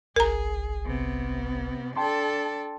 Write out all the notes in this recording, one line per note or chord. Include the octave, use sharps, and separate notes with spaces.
G1 C2 G#4 A#4 A#5
C3 B3
D4 A4 G5 A5 C6